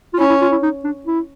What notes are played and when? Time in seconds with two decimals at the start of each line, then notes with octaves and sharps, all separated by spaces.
0.14 F4
0.19 C#4 E4
0.30 E4
0.41 F4
0.52 E4
0.62 D#4
0.84 D4
1.07 E4